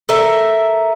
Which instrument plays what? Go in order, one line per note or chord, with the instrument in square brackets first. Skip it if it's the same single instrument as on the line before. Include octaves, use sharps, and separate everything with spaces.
[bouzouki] A4 A#4 E5